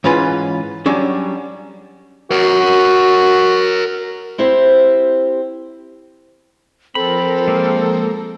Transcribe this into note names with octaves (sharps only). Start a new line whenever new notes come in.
G#2 E3 C#4 F4 B4
F#3 G3 C#4 D4
F#4 A#4 C#5
C4 E4 G4 C5
F3 C4 A4 A#4 A#5 B5
G#3 A#3